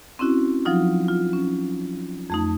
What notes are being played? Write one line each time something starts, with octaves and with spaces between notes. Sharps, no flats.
C4 C#4 E4 F#4
F3 F#3 D#4 F4
F4
C#4
F2 A3 D#4